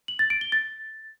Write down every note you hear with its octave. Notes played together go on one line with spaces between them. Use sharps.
F#7
A6
D7
G7
A6